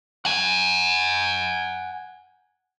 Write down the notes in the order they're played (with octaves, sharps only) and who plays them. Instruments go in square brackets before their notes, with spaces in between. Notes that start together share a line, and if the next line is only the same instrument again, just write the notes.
[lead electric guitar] F#5 G#5